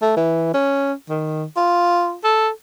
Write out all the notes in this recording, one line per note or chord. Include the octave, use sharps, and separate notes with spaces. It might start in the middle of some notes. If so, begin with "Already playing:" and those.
A3
E3
C#4
D#3
F4
A4